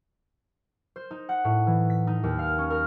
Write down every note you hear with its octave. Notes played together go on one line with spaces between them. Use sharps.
C5
D#4
F#5
A2
E3
B6
D#4
D#2
F5
C#4
A#4